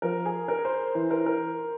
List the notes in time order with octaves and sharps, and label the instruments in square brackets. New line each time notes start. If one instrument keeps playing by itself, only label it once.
[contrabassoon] F3 [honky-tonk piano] A#4
[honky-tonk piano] G#4
A#4
C5
[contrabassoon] E3 [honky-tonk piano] C5
[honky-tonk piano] A#4
A#4